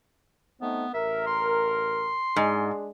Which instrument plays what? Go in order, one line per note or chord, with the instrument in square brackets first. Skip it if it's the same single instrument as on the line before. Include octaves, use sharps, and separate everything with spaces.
[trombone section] A3 C4 D#4 [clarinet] B3
[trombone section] A1 A#4 [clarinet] E5
[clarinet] C6
[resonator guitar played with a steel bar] G#2 [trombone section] G#3 D4 G#4